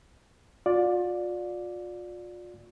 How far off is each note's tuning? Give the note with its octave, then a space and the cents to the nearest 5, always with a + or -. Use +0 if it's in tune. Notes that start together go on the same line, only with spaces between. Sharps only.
F4 +35 D5 +0